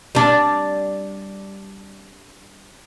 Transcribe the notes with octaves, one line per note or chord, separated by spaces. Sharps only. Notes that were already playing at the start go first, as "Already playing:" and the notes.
G3 D4